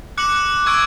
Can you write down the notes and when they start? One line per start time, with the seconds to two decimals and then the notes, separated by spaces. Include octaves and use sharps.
0.18 D6 F#6 C#7 F#7
0.66 C#6 E6 G#6 D7